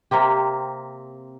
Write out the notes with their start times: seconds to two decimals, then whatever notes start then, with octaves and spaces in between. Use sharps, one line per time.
0.11 C3 A#3 C4 G4